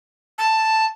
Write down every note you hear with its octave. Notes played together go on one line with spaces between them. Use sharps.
A5